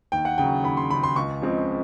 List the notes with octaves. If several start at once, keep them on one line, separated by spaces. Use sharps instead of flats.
D#2 G5
F#5
C#3 F#3 G5
D#2 B5
C6
C#3 F#3 B5
C6
C#2 C#6
C#3 F3 G#3 C4